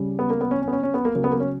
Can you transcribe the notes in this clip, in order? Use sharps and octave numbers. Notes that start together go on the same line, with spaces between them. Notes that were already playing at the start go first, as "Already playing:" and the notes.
Already playing: C#3 G3
B3
A#3
B3
C#4
C#4
B3
C#4
C#4
B3
A#3
C#3 F#3 A#3
B3
A#3
C#4